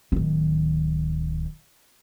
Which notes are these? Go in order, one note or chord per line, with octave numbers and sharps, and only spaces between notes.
D1 D#3